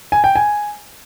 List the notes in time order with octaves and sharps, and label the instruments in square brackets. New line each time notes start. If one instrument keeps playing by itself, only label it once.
[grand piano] G#5
G5
G#5